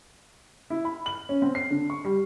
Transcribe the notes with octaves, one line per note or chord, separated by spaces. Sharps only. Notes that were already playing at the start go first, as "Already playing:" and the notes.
E4
B5
F#7
C#4
C4
C7
D3
C#6
G3